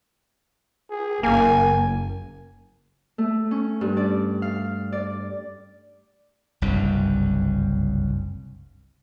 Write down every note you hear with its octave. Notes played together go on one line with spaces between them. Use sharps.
G#4
F#1 A#3 G#5
A3
C#4
G2
D5
F5
D5
F#1 C2 G2